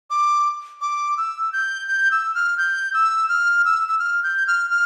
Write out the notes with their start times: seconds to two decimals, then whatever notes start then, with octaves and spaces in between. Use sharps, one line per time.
0.10 D6
0.81 D6
1.17 E6
1.53 G6
1.88 G6
2.11 E6
2.35 F6
2.58 G6
2.94 E6
3.29 F6
3.65 E6
3.89 E6
3.99 F6
4.23 G6
4.47 F6
4.70 F6